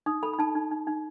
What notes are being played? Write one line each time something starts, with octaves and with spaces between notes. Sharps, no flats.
D#4 D#6
A4 B5
B5
D#4 A5
D#4
D#4
D#4